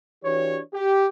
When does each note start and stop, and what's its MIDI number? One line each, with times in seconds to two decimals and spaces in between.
0.24 0.60 52
0.24 0.60 62
0.24 0.60 66
0.24 0.60 67
0.24 0.60 73
0.73 1.07 67